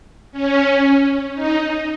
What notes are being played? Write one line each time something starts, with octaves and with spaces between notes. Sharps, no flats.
C#4
D#4